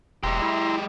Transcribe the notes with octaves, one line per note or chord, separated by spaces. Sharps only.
E1 G#3 G4 E5 A#5 C6
E4